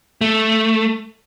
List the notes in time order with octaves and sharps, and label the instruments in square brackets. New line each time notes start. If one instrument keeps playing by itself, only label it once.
[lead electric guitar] A3